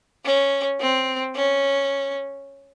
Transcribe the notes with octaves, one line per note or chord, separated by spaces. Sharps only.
C#4
C4
C#4